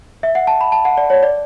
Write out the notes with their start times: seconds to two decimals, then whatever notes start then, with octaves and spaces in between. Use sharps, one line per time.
0.23 E5
0.35 F#5
0.47 A5
0.61 B5
0.72 A5
0.85 F#5
0.97 D5
1.10 C#5
1.23 D5